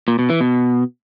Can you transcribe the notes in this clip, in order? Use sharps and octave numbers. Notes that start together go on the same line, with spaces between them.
A#2
B2
E3
B2